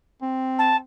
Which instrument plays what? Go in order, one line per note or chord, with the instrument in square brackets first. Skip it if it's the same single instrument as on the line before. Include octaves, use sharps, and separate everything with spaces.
[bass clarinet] C4
[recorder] A5